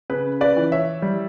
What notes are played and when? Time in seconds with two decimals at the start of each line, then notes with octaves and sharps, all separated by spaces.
0.10 C#3 B4
0.41 B4 D5
0.56 E3
0.72 C#5 E5
1.02 G3